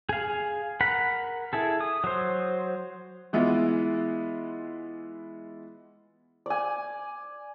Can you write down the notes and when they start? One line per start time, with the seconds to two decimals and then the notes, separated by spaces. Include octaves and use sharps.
0.09 G#4 F5
0.81 A#4 F#5 B5
1.53 E4 G#4 A4
1.81 D#6
2.04 F#3 C5
3.33 E3 G#3 B3 E4 F4
6.46 D5 G#5